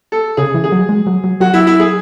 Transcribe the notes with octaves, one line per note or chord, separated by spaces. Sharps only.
A4
C#3 G#4
E3
G#4
F#3
G#3
F#3
F#3
F#3 F#4
E4
E4
G#4